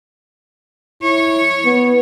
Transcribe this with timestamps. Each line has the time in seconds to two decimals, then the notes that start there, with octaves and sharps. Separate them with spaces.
1.02 E4 C#5
1.65 B3